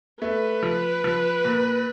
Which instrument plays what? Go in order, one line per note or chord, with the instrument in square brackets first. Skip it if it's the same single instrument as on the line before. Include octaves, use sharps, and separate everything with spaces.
[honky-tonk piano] A3 [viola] B4
[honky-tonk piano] F3
F3
A#2